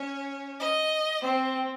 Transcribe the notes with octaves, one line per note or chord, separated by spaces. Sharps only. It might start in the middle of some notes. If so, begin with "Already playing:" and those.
Already playing: C#4 C#5
D#5
C4 C5